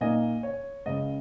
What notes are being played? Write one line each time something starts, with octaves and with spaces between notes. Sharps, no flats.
A#2 A#3 D#4 D#5 G#5
C#5
C#2 C#3 G#3 D#5